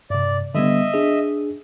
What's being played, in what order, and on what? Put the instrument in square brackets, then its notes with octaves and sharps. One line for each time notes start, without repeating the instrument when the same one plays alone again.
[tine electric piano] G2 C3 [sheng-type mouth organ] D5
[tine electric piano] D3 G3 B3 [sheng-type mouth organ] D#5 E5
[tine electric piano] D4 G#4